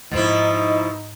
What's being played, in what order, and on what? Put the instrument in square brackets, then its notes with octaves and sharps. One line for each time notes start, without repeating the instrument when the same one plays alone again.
[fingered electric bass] G#2 G#3 A#3 [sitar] B2 F3 E4 [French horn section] D#4